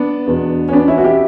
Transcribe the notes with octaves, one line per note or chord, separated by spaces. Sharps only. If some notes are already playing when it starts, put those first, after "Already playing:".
Already playing: B3 D4
E2 B2
C#4
B3 D4
C#4 E4
F#4
E4 G4